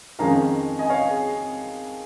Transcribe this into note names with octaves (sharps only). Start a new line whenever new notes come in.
F2 D#3 G#3 C#4 F5 A#5
D#5 G#5
C#5 F5
G#4